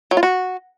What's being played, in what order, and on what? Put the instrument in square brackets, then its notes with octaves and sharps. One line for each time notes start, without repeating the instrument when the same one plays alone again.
[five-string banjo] F#3
F4
F#4